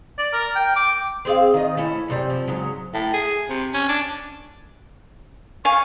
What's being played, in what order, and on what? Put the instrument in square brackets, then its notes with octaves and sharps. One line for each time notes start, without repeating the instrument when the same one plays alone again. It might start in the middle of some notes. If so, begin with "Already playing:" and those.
[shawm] D5
A#4
G5
D6
[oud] C4 G#4 F5
D#3 D#5
A3 C#4 E4
F#2 C3 G3
F3
G#2 C#3 F#3
[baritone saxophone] A2
G#4
C3
C#4
D4
[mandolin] F5 G#5 [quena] C#6